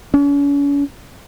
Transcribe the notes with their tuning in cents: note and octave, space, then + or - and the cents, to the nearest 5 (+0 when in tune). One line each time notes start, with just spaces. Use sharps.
C#4 +40